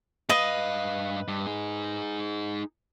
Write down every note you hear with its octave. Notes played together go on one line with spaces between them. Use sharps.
G2 B4 D#5 F5 D#6
G2
D#4 G#4